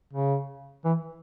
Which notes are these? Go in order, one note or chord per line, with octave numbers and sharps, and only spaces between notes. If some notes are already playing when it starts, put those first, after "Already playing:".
C#3
E3